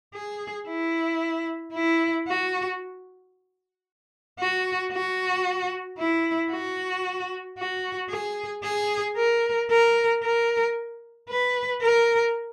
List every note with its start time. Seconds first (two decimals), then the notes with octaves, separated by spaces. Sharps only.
0.14 G#4
0.68 E4
1.74 E4
2.28 F#4
4.40 F#4
4.92 F#4
5.98 E4
6.51 F#4
7.58 F#4
8.10 G#4
8.64 G#4
9.17 A#4
9.70 A#4
10.23 A#4
11.29 B4
11.82 A#4